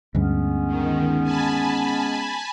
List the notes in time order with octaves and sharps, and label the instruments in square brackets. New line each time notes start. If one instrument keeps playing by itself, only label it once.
[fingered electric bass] D2 G2 [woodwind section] G#3 B3 C#4
[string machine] D#3
G#5 A5 B5